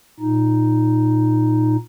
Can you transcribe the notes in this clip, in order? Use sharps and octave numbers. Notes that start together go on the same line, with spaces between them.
A#2 D#4